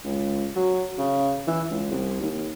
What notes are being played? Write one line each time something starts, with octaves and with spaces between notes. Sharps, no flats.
C#2
F#3
C#3
E3
C#2
C2
D#2